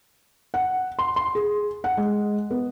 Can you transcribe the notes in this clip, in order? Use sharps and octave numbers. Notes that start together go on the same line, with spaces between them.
F#5
C6
C6
G#4
F#5
G#3
B3